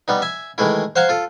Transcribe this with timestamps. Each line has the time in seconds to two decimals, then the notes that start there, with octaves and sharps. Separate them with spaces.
0.08 G3 B3 D#4
0.22 E5 G#5
0.58 D#3 E3 G#3 A3 E4
0.96 C5 F5 F#5 G#5 A#5
1.09 F4 A4